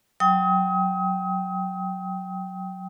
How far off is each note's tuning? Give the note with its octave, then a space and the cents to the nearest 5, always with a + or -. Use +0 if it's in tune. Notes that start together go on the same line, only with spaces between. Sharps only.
F#3 +0 G5 +0 D#6 +35